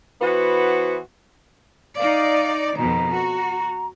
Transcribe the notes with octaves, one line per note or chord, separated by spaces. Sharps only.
E3 B3 F#4 C5
D#4 D5 F5
F2 B2 D#3 A#5
F#4